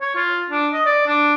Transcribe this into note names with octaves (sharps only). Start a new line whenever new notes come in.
C#5
F4
D4
D#5
D5
D4